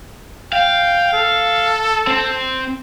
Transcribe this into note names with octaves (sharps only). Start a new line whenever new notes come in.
F5 G5
A4
C4